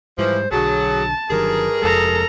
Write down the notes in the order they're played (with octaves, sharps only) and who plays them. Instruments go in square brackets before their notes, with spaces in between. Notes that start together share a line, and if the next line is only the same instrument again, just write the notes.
[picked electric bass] G#2 G3 [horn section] E3 F3 [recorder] C5
[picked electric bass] B1 D3 [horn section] F#3 [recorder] G#4 [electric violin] A5
[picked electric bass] G1 D#3 F#3 [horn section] G2 G#4 [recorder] A#4
[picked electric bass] F1 F2 G#3 [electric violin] A4 A#5